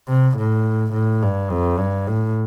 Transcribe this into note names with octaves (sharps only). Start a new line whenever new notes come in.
C3
A2
A2
G2
F2
G2
A2